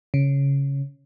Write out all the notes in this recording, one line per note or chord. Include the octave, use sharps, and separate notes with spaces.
C#3